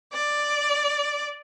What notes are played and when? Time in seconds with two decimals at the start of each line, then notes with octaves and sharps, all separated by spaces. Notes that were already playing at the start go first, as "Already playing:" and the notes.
0.12 D5